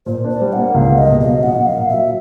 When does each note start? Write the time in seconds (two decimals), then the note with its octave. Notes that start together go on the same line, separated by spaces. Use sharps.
0.06 A#2 C5
0.24 D4
0.29 C5
0.42 G3
0.53 F#5
0.58 A#3
0.74 C#2 F5
0.91 A#3
0.98 D#5
1.08 B2
1.20 D#5
1.26 F#3
1.43 A#1 F#5
1.60 A#3
1.66 F5
1.77 A#2
1.89 F#3 E5